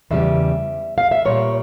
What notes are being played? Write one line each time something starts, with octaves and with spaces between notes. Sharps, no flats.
E2 C#3 G3 E5
F5
E5
A#2 G3 C#5